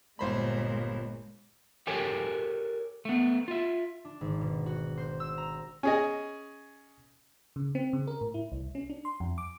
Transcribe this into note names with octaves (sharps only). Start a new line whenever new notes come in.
G1 A#2 G#3 C5 B5
G4 A4 A#4 C#5 G5 G#5
A3 B3
F4 E5
D4
G#1
B2
F#4
C5
E6
A#5
C#4 G#4 D#5
C#3
C4
C#3
A#4
A2
E4
C2
C#4
D4
C6
F2
D6